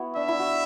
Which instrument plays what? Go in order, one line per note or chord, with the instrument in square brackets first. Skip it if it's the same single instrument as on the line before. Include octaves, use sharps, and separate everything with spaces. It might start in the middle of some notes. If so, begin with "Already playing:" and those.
Already playing: [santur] B3 E4 F#4
[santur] D4 [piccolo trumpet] E5
[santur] E4
F#4